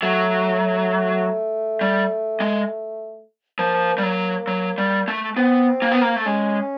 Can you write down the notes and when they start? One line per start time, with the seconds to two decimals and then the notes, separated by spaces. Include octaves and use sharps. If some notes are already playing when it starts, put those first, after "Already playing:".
0.02 F#3 A3
1.81 G3
2.40 G#3
3.59 F3 A#3
3.98 G3
4.03 F#3
4.47 F#3
4.78 G3
5.08 A3
5.36 B3 C4
5.82 A#3
5.92 B3
6.02 A#3
6.16 A3
6.26 G#3 C#4